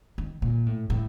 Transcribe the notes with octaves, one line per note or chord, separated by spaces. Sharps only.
D#3
A#2
A2
A2